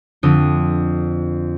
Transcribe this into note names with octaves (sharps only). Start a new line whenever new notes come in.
F2 D3 C4 D#6